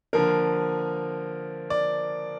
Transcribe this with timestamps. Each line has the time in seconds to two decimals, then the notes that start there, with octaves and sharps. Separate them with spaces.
0.13 D3 F3 A#3 A#4
1.70 D5